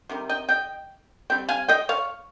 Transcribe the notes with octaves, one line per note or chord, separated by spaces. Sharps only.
C3 D#3 G3
D#5 G5
D#5 G5
G3 C4 G5
F5 G#5
D#5 G5
C#5 F5